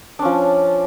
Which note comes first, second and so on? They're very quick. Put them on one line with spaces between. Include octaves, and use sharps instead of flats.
D4 C#4 F3